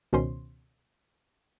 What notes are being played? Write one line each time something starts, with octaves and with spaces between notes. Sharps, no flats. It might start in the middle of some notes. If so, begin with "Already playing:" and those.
C#2 B2 D#3 C#4 C5 C6